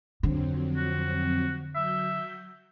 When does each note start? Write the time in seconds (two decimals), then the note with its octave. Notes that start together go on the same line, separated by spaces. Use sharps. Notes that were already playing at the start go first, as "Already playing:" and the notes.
0.23 F2 D3 F#3 C4
0.77 F#4
1.76 F#3 E5 G6